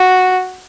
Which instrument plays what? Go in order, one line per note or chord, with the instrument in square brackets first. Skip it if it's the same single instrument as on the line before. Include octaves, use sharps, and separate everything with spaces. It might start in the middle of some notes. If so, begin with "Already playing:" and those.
Already playing: [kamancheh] F#4